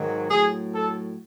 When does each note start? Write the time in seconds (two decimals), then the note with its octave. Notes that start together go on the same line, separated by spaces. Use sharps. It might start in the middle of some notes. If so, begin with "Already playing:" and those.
Already playing: G#2 D#3 F#3
0.31 A2 F#3 G#4
0.74 A4